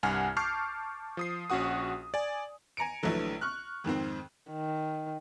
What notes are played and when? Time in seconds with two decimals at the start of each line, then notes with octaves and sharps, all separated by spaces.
0.03 C2 G2 F#5 G#5 F6 G#6
0.37 A5 C#6 D6 F6 G6 C7
1.17 F3 D#6 C7
1.50 A#1 C#4 F#4 F#5 D#6
2.14 D5 G#5
2.77 G#5 A#5 C#7 D7
3.03 A#1 D3 E3 F#3 A3
3.41 C#6 F6 F#6
3.84 F2 G#2 D#3 C4
4.51 D#3